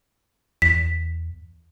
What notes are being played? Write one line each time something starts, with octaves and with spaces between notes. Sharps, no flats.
E2 B6